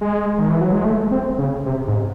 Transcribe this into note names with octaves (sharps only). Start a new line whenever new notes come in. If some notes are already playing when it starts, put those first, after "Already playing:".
G#3
D#3
E3
F#3
G#3
A3
C4
C#3
C3
G#2